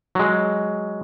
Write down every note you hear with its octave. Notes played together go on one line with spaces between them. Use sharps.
F#3 G#3